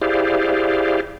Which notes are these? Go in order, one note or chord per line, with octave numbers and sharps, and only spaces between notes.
E4 G4 G#4 C5 D5 F5